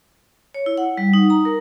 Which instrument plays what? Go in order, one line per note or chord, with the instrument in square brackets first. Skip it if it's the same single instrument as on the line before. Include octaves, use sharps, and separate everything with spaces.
[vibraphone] C#5
E4
F#5
G3
D#4
A#5
A#4